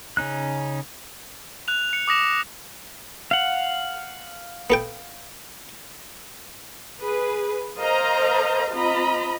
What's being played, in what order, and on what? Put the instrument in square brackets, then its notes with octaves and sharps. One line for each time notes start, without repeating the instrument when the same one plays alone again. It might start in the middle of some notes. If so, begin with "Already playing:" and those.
[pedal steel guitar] C#3 C#4 D#4 F#6
[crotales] F#6 F7
C#7
D6 D#6 A#6 E7
[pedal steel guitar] F5 F#5
[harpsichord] B3 A4 G5
[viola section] G#4 B4
A#4 C5 D#5 F5 A#5
C4 F4 D#5 A#5 B5